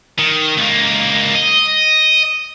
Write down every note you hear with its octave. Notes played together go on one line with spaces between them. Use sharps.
D#3
C#2 A#3
D#5